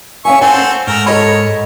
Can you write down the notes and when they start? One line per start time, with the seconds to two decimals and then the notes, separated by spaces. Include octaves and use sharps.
0.25 C#4 E5 F5 G#5 C#6
0.41 C4 A4 F#5 G#5
0.87 G#2 A3 A#4 A#5
1.06 A4 C#5 D#5 B5